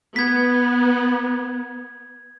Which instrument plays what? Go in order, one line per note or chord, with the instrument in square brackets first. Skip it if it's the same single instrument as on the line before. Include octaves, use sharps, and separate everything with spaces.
[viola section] B3 [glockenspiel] G#6 B6